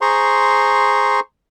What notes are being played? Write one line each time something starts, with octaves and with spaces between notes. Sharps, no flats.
G#4 C5 A#5 C6 C#6